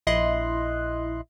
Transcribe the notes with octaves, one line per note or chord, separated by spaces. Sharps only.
A#1 E4 D#5 C6 F#6